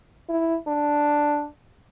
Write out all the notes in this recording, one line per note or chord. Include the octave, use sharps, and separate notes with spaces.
E4
D4